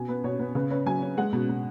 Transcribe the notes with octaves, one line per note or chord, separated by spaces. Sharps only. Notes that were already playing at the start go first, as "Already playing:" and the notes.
Already playing: B2 G#5
B3 B4
B2 C#5
B3 B4
C#3 B4
C#4 B4
F#3 G#5
C#4
G#3 F#5
B2
B2